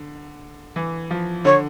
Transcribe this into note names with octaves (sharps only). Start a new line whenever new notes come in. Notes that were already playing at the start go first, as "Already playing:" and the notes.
Already playing: D3
E3
F3
D3 C#5